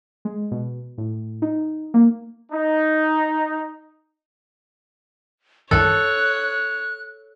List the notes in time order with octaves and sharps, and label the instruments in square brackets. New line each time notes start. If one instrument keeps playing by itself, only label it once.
[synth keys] G#3
B2
A2
D#4
A#3
[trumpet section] D#4
[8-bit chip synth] C2 F#2 D#3 [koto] A4 [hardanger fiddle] C#5 [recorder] F#6